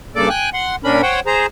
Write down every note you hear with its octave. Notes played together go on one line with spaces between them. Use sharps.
G2 C#3 A#3 A4 D5 D6
G5 G#5 F#6
F#5 C6
A#2 C#4 D4 A#4 B5
C5 C#5 F#5 G5
G#4 C5 A#5